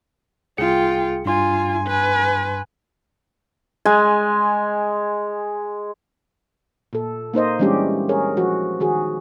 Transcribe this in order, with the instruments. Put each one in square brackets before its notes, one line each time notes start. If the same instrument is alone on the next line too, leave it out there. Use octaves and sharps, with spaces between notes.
[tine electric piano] C2 G#4 C#7 [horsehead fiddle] F4 G5
[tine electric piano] G2 C6 [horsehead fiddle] F4 G#5
[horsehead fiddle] B4 G#5
[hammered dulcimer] G#3 G#5
[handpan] A#2 A4
A#3 D#4 C5 D#5
E3 G3 G#3 C#4 D4 G4
G#4 A#4 C#5
F3 F#4
D#3 F#4 G#4